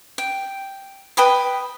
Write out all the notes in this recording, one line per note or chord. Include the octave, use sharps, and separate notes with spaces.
G5
B4 G5 B5 D#6